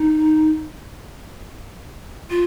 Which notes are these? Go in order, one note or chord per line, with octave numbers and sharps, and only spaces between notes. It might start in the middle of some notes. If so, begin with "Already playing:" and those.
Already playing: D#4
F4